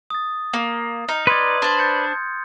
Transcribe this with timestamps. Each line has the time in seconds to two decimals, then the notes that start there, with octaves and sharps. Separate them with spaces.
0.10 D#6 A6
0.53 A#3
1.09 D#4 F6
1.27 B4 D5 C6 D#6 G#6
1.62 D4 C5
1.79 G6 A6 C#7